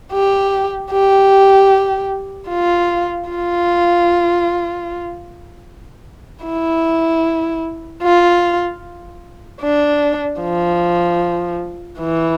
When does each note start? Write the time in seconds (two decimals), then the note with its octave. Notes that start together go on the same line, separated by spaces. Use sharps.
0.12 G4
0.91 G4
2.49 F4
3.29 F4
6.45 E4
8.02 F4
9.61 D4
10.41 F3
11.99 E3